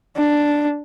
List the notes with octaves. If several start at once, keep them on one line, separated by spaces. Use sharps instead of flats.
D4